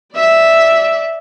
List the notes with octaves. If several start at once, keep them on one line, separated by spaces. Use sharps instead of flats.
D5 E5